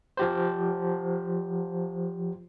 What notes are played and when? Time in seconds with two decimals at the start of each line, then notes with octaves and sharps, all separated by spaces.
0.17 F3 G4 C5